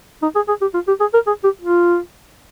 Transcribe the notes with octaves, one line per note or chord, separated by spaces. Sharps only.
D#4
G#4
G#4
G4
F4
G4
G#4
A#4
G#4
G4
F4